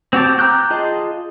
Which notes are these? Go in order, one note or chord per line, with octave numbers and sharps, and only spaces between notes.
C4 F#4 G4 A5
G5 A#5 D6 F#6 G6
F4 G#4 D#5 A5